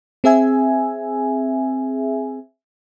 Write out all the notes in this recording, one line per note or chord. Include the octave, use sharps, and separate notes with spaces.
C4 G#4 E5 G#5